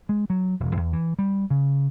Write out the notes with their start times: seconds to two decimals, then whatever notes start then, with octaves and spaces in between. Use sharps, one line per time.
0.09 G#3
0.30 F#3
0.60 E1
0.77 E2
0.93 E3
1.19 G3
1.50 C#3